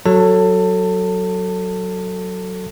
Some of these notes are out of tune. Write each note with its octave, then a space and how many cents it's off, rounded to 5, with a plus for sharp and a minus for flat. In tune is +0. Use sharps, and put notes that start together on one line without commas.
F#3 +0 A4 +15 A5 +25